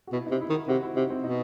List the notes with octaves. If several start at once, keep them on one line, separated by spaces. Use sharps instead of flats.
F#4
B2 E4
D#4
C3
E4
D#3
F#4
C3 F#4
E4
C3 D#4
C4
B2 D#4